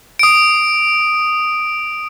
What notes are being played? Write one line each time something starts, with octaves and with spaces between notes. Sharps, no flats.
D#6 D7